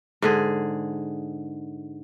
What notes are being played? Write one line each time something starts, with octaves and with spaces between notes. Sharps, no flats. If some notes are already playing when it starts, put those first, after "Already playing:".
G#2 D3 G#4